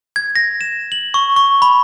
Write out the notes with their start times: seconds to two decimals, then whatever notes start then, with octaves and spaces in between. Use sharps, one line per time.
0.16 G#6
0.36 A#6
0.61 E7
0.92 F#7
1.14 C#6
1.36 C#6
1.62 B5